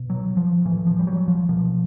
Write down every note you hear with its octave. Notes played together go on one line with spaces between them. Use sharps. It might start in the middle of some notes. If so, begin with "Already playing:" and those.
Already playing: B2
F#3
F3
A2 E3
F3
G3
F#3
F3
B2 F3